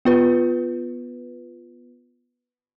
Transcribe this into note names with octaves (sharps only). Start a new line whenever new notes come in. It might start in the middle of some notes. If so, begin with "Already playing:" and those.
B3 F4 B4